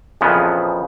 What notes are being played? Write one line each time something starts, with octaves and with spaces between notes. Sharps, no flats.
F2 A#2 C#3 E3 F3 B3